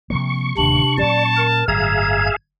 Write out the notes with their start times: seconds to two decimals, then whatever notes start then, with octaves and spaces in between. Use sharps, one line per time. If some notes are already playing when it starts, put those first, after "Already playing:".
0.10 C3 F3 A#3 C#6
0.58 D1 D#2 C3 D4 F#7
0.98 A#2 F#3 C#4 D5 A5
1.37 A#4
1.68 G1 A2 F#3 G#4 E5 F5 A#5 G#6